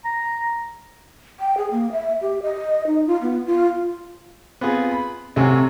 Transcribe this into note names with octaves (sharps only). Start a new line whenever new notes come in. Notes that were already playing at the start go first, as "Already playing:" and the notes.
A#5
G5
G#4
A#3
E5
G4
D#5
D#4
F4
B3
F4
B3 C4 F4 G#4
B5
C2 C3 F#3 A3 F#4 G#5